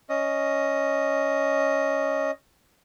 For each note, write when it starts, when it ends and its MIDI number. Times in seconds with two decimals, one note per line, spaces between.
0.09 2.31 61
0.09 2.31 75